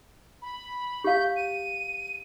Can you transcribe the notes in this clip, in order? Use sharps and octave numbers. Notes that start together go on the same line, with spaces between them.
B5
G4 F5 G6
D#7